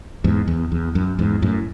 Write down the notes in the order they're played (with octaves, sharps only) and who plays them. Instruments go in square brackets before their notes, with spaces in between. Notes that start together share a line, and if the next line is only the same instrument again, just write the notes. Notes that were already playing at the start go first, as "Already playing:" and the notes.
[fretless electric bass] E2 G#2
E2
E2
F#2
E2 G#2
F#2 A2